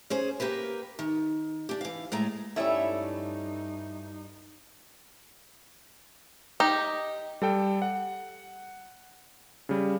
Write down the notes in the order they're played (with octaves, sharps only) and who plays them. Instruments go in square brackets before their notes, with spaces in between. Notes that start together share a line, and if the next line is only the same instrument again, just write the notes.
[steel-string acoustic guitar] C#4 G#4 C5
A#3 G4 A#4 B4
D#3
D4 G4
E3 F5
A2 G#3 A3 A#5
[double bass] G2 D#4 [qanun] G3 C#4 E4 [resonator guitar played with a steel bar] A3 E5
[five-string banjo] D#4 [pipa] G4
[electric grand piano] G3 A4 G5
F#5
C#3 G3